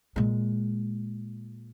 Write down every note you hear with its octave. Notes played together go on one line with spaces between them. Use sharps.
A#2 G#3